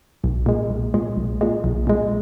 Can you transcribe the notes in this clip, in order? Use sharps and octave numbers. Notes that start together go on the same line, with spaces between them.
B1
A#2 G#3
B1
A#2 G#3
B1
A#2 G#3
B1
A#2 G#3